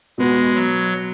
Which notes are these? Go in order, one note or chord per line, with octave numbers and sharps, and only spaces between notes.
B2 G#3 B3 F#4
F#3